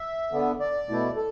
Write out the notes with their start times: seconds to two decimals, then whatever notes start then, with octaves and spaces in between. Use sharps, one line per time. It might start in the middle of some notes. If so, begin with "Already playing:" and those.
Already playing: E5
0.32 D3 B3 D4
0.60 D5
0.89 B2 A3 E4
1.16 A4